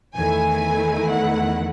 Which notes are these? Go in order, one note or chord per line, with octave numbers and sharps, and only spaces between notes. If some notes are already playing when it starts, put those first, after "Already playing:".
E2 D#3 A3 E4 G#5
F#5